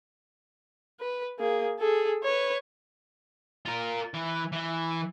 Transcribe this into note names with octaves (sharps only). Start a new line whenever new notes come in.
B4
A#3 G#4
G#4 A4
B4 C#5
F4 A#4
E3
E3